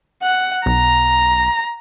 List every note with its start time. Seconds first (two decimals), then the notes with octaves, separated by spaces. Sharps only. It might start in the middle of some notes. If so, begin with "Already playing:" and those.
0.22 F#5
0.66 B1 A#5